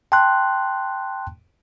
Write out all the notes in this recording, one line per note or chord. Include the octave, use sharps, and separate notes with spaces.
G5 A5 C6 F#6